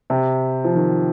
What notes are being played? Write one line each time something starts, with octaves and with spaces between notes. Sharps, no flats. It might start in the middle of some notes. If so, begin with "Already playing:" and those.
C3
F3
D#3